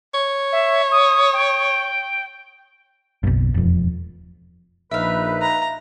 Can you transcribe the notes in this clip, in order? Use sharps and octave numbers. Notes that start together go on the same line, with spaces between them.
C#5
E5
D#6
G5
F#1 B1
E1 F2
A#1 D#4 B4 E5 F5
A#5